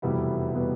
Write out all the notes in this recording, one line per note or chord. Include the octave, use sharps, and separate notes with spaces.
F1 E2 B2 G3 B3 E4
B2 G3 B3